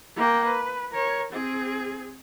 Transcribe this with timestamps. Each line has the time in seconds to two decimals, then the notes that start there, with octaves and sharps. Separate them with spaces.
0.16 A#3 G5
0.45 B4
0.92 A#4 C#5
1.32 C4 G#4